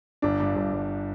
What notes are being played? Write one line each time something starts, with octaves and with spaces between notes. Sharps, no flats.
G1 D4
G2
G1
G1